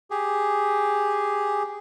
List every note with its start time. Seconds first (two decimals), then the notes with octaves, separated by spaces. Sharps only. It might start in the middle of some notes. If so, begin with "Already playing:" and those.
0.11 G4 G#4